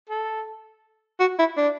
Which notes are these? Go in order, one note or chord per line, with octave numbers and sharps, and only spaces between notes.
A4
F#4
E4
D4